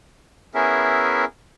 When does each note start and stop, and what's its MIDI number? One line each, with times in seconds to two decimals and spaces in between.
0.55 1.25 59
0.55 1.25 61
0.55 1.25 64
0.55 1.25 68
0.55 1.25 70
0.55 1.25 76